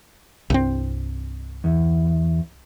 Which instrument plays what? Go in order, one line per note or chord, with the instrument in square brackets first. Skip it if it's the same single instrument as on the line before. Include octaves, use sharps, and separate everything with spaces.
[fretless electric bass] C2 G2 C4
[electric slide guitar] E2